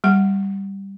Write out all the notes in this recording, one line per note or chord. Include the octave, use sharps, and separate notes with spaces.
G3 F#5